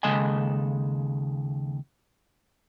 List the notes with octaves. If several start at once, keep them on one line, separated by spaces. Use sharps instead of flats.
D#2 C#3 G#3 A4 D#5 G#5